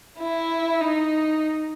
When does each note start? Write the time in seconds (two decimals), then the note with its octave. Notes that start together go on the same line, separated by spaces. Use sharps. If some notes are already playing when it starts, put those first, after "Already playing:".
0.19 E4
0.81 D#4